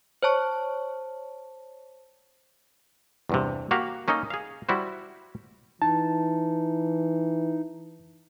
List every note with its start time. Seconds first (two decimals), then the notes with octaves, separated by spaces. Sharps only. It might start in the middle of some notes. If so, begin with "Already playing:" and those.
0.23 C5 C#5 A5 C#6
3.29 E2 G2 C3
3.71 A#3 F#4 G4 F5
4.08 A#3 C#4 D#4 A4 D#5
4.30 G#4 F5
4.69 G3 E4 F#4 C5
5.82 E3 D#4 A5